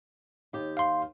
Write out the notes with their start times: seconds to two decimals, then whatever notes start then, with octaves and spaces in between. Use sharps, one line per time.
0.53 D#2 G4
0.77 F5 C6